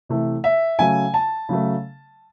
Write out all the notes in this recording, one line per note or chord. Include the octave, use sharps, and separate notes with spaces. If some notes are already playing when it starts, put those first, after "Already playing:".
C3 E3 A3
E5
C#3 F#3 A3 G#5
A5
C#3 F#3 A3